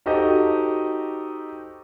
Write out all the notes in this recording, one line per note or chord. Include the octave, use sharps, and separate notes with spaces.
D#4 F#4 G4 A4 C5 D#5